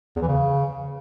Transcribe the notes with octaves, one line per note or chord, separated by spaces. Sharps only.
E2
E3
C#3